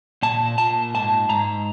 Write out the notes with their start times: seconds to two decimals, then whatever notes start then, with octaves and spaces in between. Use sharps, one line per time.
0.23 A#2 A5
0.58 A#2 A5
0.95 G#2 A5
1.29 G#2 A#5